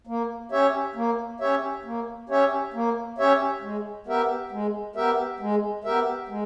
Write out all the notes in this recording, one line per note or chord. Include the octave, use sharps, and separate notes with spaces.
A#3
C#4 G4 C#5 E5
A#3
C#4 G4 C#5 E5
A#3
C#4 G4 C#5 E5
A#3
C#4 G4 C#5 E5
G#3
B3 G4 A#4 E5
G#3
B3 G4 A#4 E5
G#3
B3 G4 A#4 E5
G#3